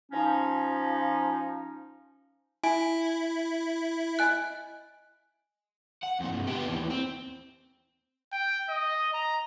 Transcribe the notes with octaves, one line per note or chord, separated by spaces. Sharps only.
F3 C#4 D#4
E4 G#5
D#5 G#5 F#6
F#5
F2 A#2
G2 C3
B3 G4
D#2 E3
C4
G5
D#5
A#5